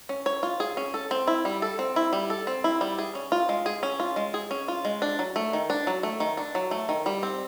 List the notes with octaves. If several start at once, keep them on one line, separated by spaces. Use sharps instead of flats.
C#4
C#5
F4
G#4
C#4
A4
C4
E4
G3
A4
C4
E4
G3
A4
C4
E4
G3
G#4
C#4
F4
G#3
G#4
C#4
F4
G#3
G#4
C#4
F4
G#3
D4
F#3
A3
D#3
D4
F#3
A3
D#3
D4
F#3
A3
D#3
G3
C4